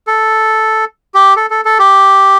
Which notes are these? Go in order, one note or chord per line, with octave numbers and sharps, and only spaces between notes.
A4
G4
A4
A4
A4
G4